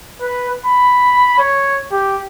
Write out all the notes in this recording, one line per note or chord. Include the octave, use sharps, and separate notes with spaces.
B4
B5
C#5
G4